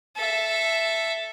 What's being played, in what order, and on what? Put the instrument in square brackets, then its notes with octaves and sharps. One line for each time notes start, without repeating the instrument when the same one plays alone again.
[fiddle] A4 E5